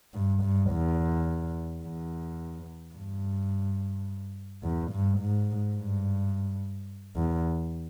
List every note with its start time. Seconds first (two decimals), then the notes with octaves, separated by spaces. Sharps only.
0.14 G2
0.42 G2
0.71 E2
1.83 E2
2.94 G2
4.63 E2
4.92 G2
5.19 G#2
5.75 G2
7.16 E2